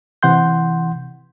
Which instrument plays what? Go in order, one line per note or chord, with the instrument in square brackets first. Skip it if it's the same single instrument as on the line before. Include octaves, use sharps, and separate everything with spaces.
[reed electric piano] C3 E3 F#5 C6 G6